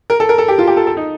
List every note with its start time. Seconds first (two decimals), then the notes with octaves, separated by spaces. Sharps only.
0.10 A#4
0.20 A4
0.29 A#4
0.38 A4
0.48 G4
0.58 F4
0.67 G4
0.77 A4
0.87 A4
0.97 D#4